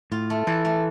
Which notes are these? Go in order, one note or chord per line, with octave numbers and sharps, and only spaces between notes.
A2 F4
A3
E3 A4
A3